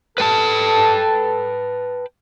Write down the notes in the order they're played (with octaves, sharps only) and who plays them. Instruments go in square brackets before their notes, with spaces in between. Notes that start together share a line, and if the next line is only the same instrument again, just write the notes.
[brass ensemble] A4 [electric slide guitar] B4 G5 A5